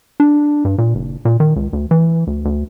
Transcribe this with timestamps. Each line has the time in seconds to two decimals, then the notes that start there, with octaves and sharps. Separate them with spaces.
0.20 D4
0.65 G2
0.78 A#2
0.95 F#1
1.25 A#2
1.40 D#3
1.56 C#2
1.73 D2
1.91 E3
2.27 D2
2.45 D2